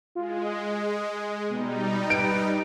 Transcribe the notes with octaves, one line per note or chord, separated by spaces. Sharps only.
G#3 F4
D#5
B2 G3 D#4
B4 D7